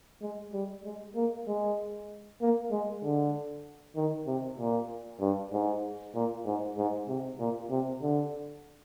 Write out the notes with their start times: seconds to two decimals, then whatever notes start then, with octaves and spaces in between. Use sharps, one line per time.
0.22 G#3
0.53 G3
0.85 G#3
1.15 A#3
1.48 G#3
2.41 A#3
2.71 G#3
3.03 D3
3.96 D#3
4.27 C3
4.59 A#2
5.21 G2
5.52 G#2
6.15 A#2
6.46 G#2
6.77 G#2
7.08 C3
7.39 A#2
7.71 C3
8.02 D3